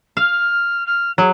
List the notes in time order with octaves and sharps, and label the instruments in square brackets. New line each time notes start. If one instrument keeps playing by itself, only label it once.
[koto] F5 [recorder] F6
[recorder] F6
[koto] F#3 [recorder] G#4